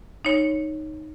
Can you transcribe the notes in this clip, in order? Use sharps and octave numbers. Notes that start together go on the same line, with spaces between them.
D#4 C#5